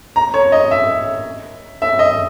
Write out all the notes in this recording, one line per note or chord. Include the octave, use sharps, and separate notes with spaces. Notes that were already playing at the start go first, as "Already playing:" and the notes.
A#5
C#5
D#5
E5
E5
D#5